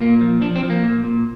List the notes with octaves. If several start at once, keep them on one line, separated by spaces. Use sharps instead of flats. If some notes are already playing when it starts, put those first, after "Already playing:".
A#2 A#3
F3
F3 D4
C4
F3
A#3
A#2
A#2